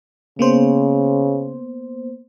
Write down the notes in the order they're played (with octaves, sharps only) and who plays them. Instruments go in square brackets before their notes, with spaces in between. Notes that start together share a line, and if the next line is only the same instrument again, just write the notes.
[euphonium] C#3 [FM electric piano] A#3 B3 C5